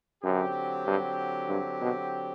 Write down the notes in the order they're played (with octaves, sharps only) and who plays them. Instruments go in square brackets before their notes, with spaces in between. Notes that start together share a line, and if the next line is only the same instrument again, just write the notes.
[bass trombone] F#2 [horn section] D3 F#3 C4 G4
[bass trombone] G2
G2
B2